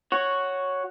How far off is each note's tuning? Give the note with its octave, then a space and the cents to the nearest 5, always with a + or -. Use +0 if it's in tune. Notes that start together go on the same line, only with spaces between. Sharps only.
F#4 +0 C#5 +0